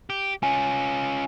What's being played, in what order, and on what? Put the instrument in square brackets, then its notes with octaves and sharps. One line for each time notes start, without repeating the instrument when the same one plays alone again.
[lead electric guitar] G4
[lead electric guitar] C#4 F4 [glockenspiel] G#5